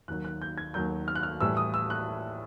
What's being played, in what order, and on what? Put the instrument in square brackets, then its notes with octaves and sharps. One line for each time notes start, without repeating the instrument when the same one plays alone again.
[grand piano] D#2 D#3 F#3 F#6
F#6
G6
G#6
D#2 D#3 F#3 G6
F6
F#6
F6
A2 E3 G3 E6
D#6
E6
F#6